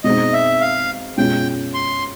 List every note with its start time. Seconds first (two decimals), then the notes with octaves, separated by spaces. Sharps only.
0.04 B2 G#3 C4 D#4 D#5
0.33 E5
0.61 F5
1.18 B2 G#3 C#4 F4 G5
1.74 C6